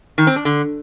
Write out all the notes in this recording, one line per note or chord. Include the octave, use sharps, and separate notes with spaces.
D#3
C4
D4
D3